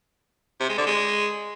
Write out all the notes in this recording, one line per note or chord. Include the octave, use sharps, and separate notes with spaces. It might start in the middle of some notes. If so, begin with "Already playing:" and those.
C3
G#3
D3
G#3